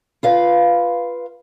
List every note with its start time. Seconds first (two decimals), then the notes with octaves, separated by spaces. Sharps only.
0.23 F4 B4 F5